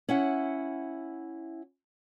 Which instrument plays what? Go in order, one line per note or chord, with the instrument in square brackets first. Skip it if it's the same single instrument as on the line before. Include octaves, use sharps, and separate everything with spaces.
[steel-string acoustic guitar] C#4 E4 F#5